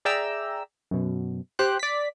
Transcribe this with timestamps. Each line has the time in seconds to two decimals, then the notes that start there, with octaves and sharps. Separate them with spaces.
0.05 G#4 D5 E5 G5 A#5 E6
0.91 F#2 B2
1.59 G4 C5 G5 F#6
1.79 D5 B6